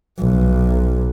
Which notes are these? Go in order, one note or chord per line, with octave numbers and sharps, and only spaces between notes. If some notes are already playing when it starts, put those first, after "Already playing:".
B1